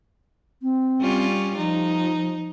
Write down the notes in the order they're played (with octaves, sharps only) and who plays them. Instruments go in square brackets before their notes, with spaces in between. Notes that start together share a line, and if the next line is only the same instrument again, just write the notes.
[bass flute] C4
[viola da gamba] G3 C#4 F4
[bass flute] F3 [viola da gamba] D#4